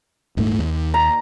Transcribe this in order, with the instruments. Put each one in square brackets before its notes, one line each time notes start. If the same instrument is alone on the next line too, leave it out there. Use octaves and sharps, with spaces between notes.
[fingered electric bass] D#1 G#2 A3
D#2
[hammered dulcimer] A#5